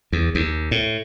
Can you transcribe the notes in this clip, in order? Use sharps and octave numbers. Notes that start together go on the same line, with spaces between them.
E2
D#2
A2